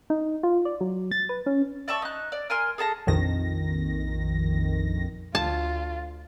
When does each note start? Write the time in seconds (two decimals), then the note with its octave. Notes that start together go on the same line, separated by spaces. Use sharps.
0.10 D#4
0.43 F4
0.65 D5
0.81 F#3
1.12 A6
1.29 B4
1.46 C#4
1.88 D5 E5 A5 C#6
2.02 D#4 F#6
2.32 D5
2.50 A#4 G#5 C6 F6
2.78 G#4 A4 A5 A#5
3.07 A#1 F2 D#3 A#6
5.35 D2 F4 A5